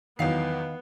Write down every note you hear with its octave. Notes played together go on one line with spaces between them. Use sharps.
E2 D#3 F#3 B3 F5 C7